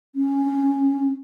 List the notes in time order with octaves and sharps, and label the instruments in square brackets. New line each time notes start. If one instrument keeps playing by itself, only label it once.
[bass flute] C#4